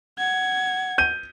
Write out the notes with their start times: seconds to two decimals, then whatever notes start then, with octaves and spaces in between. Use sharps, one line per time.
0.18 F#5 G#6
0.98 G6 D#7